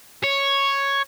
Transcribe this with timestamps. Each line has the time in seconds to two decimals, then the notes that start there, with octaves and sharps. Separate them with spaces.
0.24 C#5